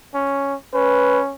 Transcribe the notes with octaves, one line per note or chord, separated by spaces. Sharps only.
C#4
C#4 B4